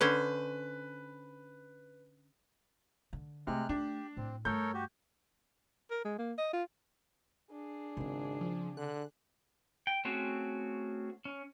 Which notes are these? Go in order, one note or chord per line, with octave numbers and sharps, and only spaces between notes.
D3 C#4 B4 C5
D3
C3 G#3 A3 F6 F#6
A3 D4 G4
A2 C4
G2 A3 A4 A#4 C#5 G6
F#4 G4
A#4
G#3
A#3
D#5
F4
D4 G#4
G#1 C#3 C4
F3
D3 F#6
G5
A3 C4 C#4 F#4 G#4
C#4